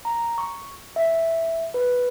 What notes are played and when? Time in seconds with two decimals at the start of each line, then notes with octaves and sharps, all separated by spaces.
0.05 A#5
0.38 C#6
0.96 E5
1.74 B4